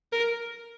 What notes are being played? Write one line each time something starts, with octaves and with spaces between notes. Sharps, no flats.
A#4